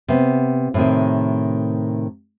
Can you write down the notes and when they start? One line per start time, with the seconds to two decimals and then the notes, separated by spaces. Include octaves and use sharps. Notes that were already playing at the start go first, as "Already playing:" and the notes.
0.08 C3 B3
0.74 A2 C3 D#3